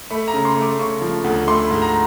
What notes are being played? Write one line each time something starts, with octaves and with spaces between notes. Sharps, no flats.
A3 B5
A#5
C#3
C6
A3
D6
C#3 C#6
F3
D2
A3 C6
B5
G#2
A#5